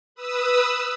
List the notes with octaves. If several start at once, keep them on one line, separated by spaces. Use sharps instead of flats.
B4 D#6 E6